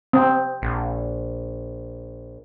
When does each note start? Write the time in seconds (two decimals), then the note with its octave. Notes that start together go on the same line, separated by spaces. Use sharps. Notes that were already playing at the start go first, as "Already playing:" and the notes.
0.13 C4
0.62 A#1